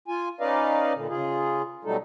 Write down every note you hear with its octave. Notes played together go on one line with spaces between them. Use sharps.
F4 G#5
C#4 D#4 B4 D5 D#5 F5
A#2 D3
C#3 F4 G#4
B2 F#3 G3 A3 D#4 A4